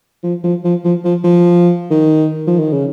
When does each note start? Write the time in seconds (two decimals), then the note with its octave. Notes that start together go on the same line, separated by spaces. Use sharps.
0.24 F3
0.44 F3
0.65 F3
0.84 F3
1.04 F3
1.24 F3
1.90 D#3
2.47 F3
2.59 D#3
2.72 C#3